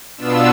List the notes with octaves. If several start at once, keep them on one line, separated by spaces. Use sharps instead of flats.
B2 B3 D4 F4 E6